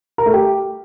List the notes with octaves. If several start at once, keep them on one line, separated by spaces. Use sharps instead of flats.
A#4
A3
G4